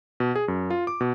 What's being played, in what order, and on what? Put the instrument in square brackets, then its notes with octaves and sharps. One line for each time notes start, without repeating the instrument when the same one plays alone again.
[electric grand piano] B2
G#4
F#2
F4
D6
B2